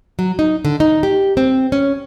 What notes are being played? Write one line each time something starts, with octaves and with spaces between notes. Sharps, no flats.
F#3
D#4
D3
D#4
G4
C4
C#4